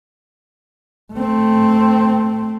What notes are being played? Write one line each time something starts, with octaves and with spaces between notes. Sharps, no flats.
A3 C4